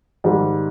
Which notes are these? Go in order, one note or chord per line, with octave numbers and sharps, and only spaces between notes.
G#2 D#3 G3